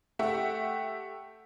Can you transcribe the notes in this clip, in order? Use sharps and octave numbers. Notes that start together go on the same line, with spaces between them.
A3 G4 E5 F#5